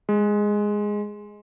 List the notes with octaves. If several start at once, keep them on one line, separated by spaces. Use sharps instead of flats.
G#3